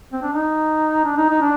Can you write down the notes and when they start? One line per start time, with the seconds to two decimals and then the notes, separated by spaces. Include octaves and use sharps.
0.13 C4
0.22 D4
0.33 D#4
1.05 D4
1.17 D#4
1.29 D#4
1.41 D4